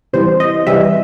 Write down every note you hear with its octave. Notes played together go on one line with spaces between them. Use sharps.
C3 E3 G3 C5
D#5
C3 E3 G3 E5